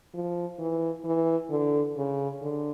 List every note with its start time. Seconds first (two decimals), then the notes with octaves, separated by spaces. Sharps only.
0.14 F3
0.59 E3
1.04 E3
1.50 D3
1.97 C#3
2.42 D3